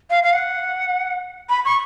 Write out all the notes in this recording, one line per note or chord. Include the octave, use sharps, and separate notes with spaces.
F5
F5
F#5
B5
C#6